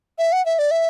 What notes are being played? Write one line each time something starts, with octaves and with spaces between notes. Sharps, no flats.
E5
F#5
E5
D5
E5